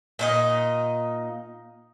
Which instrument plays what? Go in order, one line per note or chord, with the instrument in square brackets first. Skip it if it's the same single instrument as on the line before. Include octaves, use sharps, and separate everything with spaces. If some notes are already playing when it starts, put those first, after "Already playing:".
[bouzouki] A#2 D#4 D#5